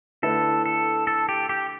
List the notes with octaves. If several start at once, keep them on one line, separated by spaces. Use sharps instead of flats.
D3 A3 E4 A4 B4
A4
A4
G4
G4